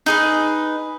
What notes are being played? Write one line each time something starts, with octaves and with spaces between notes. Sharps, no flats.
D#4 G#4 B4